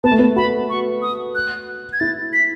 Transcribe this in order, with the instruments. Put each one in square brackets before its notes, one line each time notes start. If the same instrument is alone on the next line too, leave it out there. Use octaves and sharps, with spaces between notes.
[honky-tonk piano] B3 [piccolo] A5
[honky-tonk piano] A3
B3
[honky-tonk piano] F#4 [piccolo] B5
[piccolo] C#6
D#6
F#6
G#6
[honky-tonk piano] E4 [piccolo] A6
[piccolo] B6